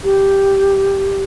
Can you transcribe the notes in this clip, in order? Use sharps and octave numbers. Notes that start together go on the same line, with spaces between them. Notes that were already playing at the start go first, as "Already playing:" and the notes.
G4